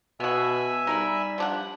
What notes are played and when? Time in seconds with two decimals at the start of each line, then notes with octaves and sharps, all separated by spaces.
0.20 B2 B3 E5 F#5 G#5 E6
0.87 G3 D#4 A#4 B5
1.38 F3 D4 F#5